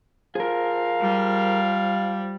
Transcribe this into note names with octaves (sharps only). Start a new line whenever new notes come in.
F3 G#4 A#4 F5
G3